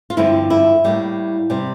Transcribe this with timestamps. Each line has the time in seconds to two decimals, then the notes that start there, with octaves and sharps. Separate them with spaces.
0.10 F4
0.17 G2 D3 F3 C4 E4
0.50 E4
0.84 A2 G3 A#3
1.50 C3 G3